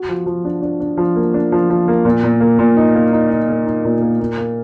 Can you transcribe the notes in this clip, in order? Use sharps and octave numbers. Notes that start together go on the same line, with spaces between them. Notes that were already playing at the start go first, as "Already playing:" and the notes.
Already playing: F#4
F3
F3
D4
D4
D4
F3
A#3
D4
F3
F3
A#3
A#2
A#2
A#3
A#2
D#4
A#3
D#4
D#4
A#3
D#4
A#2
A#3
A#3
A#3